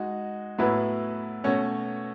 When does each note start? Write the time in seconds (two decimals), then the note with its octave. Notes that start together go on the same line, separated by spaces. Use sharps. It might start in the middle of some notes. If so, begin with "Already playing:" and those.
Already playing: G#3 D#4 F#4
0.58 A2 F#3 B3 E4 B4
1.44 B2 A3 C#4 F#4 C#5